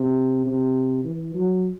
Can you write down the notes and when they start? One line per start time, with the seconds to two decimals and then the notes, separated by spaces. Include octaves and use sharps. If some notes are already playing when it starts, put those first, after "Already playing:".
Already playing: C3
0.46 C3
1.05 E3
1.34 F#3